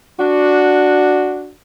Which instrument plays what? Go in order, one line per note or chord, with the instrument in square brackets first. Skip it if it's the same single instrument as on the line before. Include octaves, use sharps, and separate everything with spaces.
[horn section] D4 F#4